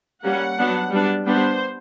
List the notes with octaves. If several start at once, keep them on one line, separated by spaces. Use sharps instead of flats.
G3 A#3 C#4 F#5
F#3 B3 D4
G3 B3 D4
G3 B3 D4 C5